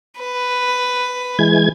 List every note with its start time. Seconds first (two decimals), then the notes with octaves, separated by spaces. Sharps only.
0.19 B4
1.39 E3 G#3 G#6